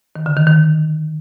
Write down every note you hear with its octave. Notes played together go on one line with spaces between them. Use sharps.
D#3
D3
D#3
D#3